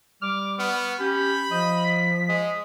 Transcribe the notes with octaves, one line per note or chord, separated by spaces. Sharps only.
G3 D6 F6
B3 C#6 F6
C#4 G4 B5 G6
F3 D#5
B6
G#3 D#5